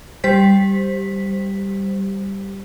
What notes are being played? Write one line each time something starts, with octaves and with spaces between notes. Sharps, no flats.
G3 G4 C5 B6